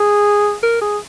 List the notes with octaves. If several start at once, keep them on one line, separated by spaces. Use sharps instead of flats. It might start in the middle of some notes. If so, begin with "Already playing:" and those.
Already playing: G#4
A#4
G#4